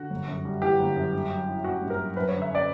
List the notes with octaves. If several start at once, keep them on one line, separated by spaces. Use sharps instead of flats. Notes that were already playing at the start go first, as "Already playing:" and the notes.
Already playing: D3 F#4
G1
F#2
G3
E3 G4
G1
F#2
G2
F#3
E4
C#4 F#4
G2
A#4
F#3
F#2 B4
C#5
D3
E5
C#4 D5